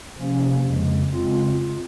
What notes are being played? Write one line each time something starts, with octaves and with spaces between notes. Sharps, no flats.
C3 F3 A#3 C#4
F2 C#3 G#3
C#3 G#3 C4 F4